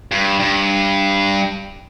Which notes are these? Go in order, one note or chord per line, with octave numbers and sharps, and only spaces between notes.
G2
G2